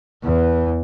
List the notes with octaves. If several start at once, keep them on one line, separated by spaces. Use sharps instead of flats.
E2 E3